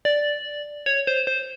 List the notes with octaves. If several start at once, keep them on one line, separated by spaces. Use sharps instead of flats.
D5
C#5
C5
C5